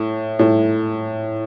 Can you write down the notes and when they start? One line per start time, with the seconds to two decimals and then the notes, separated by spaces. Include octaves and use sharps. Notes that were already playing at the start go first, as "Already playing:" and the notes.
Already playing: A2
0.39 A2